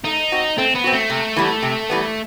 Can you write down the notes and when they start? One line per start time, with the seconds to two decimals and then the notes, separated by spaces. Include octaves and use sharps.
0.05 A3 D#4
0.32 C4 F#4
0.58 A3 C4
0.75 B3
0.84 C4 F#4
0.93 A3
1.10 C3
1.36 E3 G3 B3
1.62 C3
1.90 E3 G3 B3